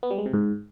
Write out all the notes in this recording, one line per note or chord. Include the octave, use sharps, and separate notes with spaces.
B3
G3
G#3
C3
G#2